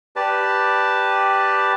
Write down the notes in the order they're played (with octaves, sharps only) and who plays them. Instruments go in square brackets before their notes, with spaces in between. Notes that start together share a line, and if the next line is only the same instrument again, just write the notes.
[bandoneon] G4 B4 D5 A5